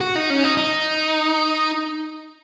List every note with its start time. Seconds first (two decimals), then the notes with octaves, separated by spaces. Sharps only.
0.01 F#4
0.16 D#4
0.30 C#4
0.44 D#4
0.57 D#4